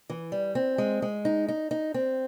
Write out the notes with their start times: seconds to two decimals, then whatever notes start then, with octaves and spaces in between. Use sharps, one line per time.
0.10 E3
0.32 G3
0.55 C4
0.78 G#3
1.02 G#3
1.25 D#4
1.48 D#4
1.71 D#4
1.94 C4